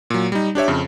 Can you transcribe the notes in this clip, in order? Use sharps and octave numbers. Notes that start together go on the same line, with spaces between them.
A#2 F#3
G3 D#4
D4 G4 C#5 E5
F2 C#3